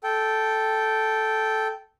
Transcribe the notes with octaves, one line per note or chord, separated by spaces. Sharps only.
A4 G5